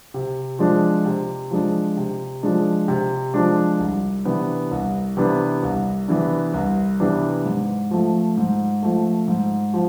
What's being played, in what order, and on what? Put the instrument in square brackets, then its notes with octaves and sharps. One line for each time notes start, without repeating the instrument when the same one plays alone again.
[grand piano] C3
F3 G#3 D4
C3
F3 G#3 D4
C3
F3 G#3 D4
C3
F3 G#3 D4
C2
C3 E3 B3 D4
C2
C3 E3 B3 D4
C2
C3 E3 B3 D4
C2
C3 E3 B3 D4
G#2
F3 A3
G#2
F3 A3
G#2
F3